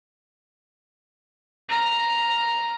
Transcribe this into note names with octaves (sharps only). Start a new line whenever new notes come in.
A#5 F6